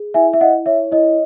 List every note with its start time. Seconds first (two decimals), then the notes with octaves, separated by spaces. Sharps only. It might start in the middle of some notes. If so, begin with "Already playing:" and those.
Already playing: G#4
0.14 E4 E5 G#5
0.33 E5
0.41 E4 D#5 F#5
0.66 C#5 E5
0.91 E4 D#5